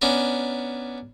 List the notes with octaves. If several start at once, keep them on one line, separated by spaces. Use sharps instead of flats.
B3 C#4 D4 A#4